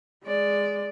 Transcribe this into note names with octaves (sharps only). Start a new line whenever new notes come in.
G#3 D5